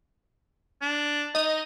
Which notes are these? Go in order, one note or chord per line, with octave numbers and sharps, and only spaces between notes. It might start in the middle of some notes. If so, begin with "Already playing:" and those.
D4
D#4 D#5